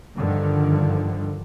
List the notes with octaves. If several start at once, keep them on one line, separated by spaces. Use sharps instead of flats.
G2 D3 D#3 F3